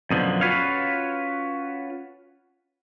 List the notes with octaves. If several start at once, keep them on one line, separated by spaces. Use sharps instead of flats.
F#2 B2 D3 F3
C#4 F4 F#4 B4 C#5 F5